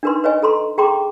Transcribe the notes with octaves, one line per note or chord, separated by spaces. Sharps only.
D4 D#4 A#4 B4 C6
B4 C#5 D#5 G#5
A4 A#5 C6
G#4 G5 A#5 C6 D6